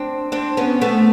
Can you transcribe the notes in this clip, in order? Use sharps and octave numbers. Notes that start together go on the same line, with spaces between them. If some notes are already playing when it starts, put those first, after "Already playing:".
Already playing: C4 D4
C4 D4
B3 C#4
A3 B3